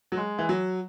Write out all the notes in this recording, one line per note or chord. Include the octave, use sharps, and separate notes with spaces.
F#3
G#3
E3
F#3